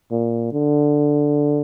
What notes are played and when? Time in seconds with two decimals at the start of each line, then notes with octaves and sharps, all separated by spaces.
0.11 A#2
0.53 D3